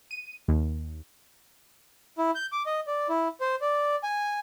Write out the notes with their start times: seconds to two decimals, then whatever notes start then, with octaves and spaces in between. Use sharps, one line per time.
0.11 D#7
0.48 D#2
2.18 E4
2.35 G6
2.52 D6
2.66 D#5
2.87 D5
3.09 E4
3.41 C5
3.61 D5
4.04 G#5